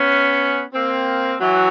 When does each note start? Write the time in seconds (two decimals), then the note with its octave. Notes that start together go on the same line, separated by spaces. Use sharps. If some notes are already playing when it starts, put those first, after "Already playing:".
Already playing: B3 C#4
0.74 A#3 C4
1.40 E3 F#3